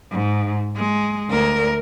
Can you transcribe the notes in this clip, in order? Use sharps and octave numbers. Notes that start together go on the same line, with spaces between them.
G#2
G#3
D2 A#4